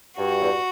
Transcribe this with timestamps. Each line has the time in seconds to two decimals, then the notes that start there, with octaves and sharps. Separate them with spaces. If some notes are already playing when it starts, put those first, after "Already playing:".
0.18 G2 F#4
0.41 E2